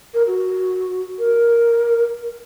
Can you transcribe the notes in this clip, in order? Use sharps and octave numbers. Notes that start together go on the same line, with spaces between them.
A#4
F#4
A#4